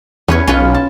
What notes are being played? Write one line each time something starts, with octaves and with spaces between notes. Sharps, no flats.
E2 C#4 B4 C#5
B1 C#4 F4 B4
A5